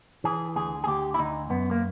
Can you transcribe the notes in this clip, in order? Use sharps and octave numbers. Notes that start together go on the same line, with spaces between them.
E3 G#4
D2 G#4
G#4
D2 G4
E4
D2 D#4
F#2 B3
A#3